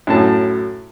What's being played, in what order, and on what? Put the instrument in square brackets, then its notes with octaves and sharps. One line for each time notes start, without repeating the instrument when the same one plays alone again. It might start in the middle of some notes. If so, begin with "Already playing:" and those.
[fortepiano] F#2 A2 A5